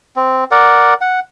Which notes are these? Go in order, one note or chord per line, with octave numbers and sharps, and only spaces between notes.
C4
A#4 D5 F#5
F#5